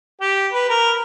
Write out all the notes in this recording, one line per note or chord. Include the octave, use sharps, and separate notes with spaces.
G4
B4
A#4